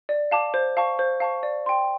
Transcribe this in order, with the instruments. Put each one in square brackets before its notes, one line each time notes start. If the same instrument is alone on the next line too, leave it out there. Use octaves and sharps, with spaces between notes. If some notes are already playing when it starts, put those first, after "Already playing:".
[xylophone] D5
F5 A5 D6
C5
F5 A5 C#6
C5
F5 A5 C#6
D5
G5 C6